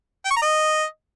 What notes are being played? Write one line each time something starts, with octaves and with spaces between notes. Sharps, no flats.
G5
C#6
A#5
D#5